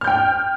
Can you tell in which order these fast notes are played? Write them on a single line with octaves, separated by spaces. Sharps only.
F6 G6 G5